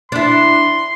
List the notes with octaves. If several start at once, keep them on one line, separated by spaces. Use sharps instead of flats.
D4 E4 C6